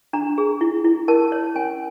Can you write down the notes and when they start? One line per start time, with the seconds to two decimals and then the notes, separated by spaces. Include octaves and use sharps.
0.13 D4 A#5
0.38 G#4
0.61 E4
0.85 E4
1.08 A#4 A5
1.32 C#5
1.55 C#4 G#5